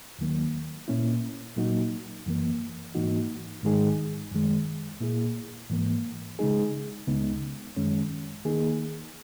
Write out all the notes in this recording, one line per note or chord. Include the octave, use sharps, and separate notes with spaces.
D#2 D#3 F#3 A#3
A#2 A#3 C#4 E4
A#2 F#3 A#3 D#4 F#4
F#2 E3 A#3
G#2 E3 A#3 D#4 F#4
G#2 D#3 G#3 D#4 G#4
F#2 D#3 G#3
A#2 A#3 E4 G#4
G#2 E3 A#3
C#3 G#3 D#4 G#4
C#2 C#3 G#3 B3 D#4
F#2 D#3 G#3 C#4
D#3 A#3 D#4 G#4